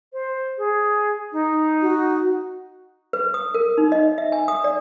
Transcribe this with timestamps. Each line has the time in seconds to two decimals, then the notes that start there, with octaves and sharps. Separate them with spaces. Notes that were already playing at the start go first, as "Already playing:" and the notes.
0.13 C5
0.58 G#4
1.33 D#4
1.82 F#4
3.13 B4
3.34 D#6
3.54 A#4
3.78 D#4
3.92 D#5
4.18 E5
4.32 G#5
4.48 D#6
4.64 D5